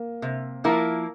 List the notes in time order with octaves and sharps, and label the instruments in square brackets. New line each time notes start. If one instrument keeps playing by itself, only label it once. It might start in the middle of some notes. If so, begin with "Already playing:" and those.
Already playing: [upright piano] A#3
[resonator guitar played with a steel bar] C3
F3 A#3 E4 A#4